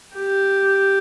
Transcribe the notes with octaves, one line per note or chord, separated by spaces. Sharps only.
G4